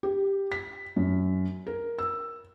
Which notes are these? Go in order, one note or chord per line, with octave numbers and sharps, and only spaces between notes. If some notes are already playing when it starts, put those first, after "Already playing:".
G4
B6
F#2
A#4
E6